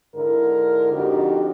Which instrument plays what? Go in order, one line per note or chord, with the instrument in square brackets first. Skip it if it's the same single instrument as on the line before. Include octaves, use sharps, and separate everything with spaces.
[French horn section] G#2 D3 E4 A#4
F2 D4 D#4 F#4 G4